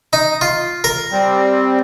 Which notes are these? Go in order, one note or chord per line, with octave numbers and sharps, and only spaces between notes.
D#4
F4
A#4
G3 C4